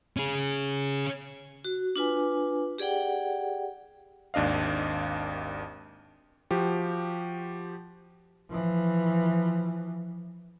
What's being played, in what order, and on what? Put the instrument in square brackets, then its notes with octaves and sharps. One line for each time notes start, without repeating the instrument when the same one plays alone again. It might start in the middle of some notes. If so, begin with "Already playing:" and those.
[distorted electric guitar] C#4 G#4
[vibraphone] F#4
D4 F4 B4 G#5
G4 G#4 D5 F#5 G5
[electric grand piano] G#1 D#2 D4 D#5 F5
F3 F#4 G4
[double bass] E3 F3